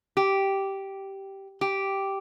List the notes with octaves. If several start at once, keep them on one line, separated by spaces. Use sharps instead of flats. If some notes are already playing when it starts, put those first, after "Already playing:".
G4
G4